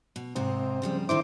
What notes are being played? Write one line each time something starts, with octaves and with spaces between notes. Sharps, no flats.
B2
G#2 C3 C4 D#4
C#3 F3 G3
D3 D#3 D#4 E4 C5 D6